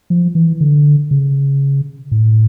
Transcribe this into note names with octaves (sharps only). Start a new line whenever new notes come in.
F3
E3
D3
C#3
A2